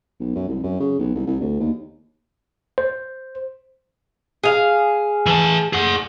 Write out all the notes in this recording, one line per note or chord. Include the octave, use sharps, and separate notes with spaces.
B1
F#2
C2
F#2
C#3
B1
C2
C2
D2
D#2
C5
G#4 F5
E3 A5
G#4 F#5